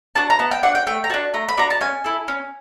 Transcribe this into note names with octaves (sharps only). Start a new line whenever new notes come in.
D4 F#4 A5
A#5
B3 A5
G5
D4 F#4 F#5
G5
A3 G5
A#5
D4 F#4 A5
A3 A#5
B5
D4 F#4 A#5
A5
C#4 G#5
E4 A4
C#4